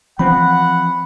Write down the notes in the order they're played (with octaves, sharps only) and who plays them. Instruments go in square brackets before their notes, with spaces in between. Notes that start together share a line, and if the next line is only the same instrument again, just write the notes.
[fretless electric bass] E3 F3 C4 [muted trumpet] F#5 [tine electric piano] B5